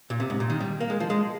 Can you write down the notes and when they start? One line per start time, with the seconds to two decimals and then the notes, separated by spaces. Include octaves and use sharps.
0.10 A#2
0.20 C3
0.30 G#2
0.40 A#2
0.50 D#3
0.60 G3
0.80 A#3
0.90 G#3
1.00 F3
1.10 G#3